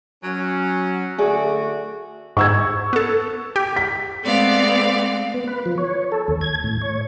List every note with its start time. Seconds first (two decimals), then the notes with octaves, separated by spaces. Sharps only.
0.24 F#3 C#4
1.19 D3 A3 F#4 G#4 D5
2.37 G#2 C#6 E6 G#6
2.93 B3 A4
3.56 G4
3.76 B6
4.24 G#3 A3 B3 C4 D5 F5
5.34 B3
5.48 B4
5.66 F3
5.78 C#5
6.12 A4
6.28 D#2
6.41 G#6
6.64 A2
6.82 C#5